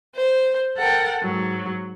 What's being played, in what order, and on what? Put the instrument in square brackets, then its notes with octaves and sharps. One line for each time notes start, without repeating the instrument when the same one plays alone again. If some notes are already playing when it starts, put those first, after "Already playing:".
[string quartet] C5
A4 A#4 F#5 G5
G#2 F#3